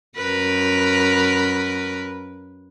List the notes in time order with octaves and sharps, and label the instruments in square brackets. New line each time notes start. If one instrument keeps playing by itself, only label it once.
[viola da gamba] F#2 A#4 B4